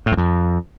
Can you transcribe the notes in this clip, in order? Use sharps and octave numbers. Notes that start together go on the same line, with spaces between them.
A2
E2
F2